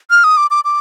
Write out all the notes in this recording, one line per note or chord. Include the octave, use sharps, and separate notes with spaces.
F6
D#6
D6
D6
D6